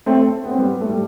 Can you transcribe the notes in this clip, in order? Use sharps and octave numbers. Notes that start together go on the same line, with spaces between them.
A3 C4
B3
C4
G3 B3
A3
G3